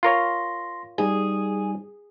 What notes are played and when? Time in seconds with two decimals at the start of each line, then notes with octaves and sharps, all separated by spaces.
0.03 F4 A#4 C#5 C6 A#6
0.98 G3 D#4 G#4